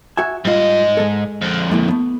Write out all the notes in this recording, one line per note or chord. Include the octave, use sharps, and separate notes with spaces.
F#4 E5 G#5
G#2 G3 F4 D#5
G#3 A4
F2 D3
G#3 A#3 E4
A3 B3